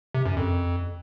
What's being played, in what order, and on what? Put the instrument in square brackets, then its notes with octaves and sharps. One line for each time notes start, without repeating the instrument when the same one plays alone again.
[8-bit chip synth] C3
F#2
F2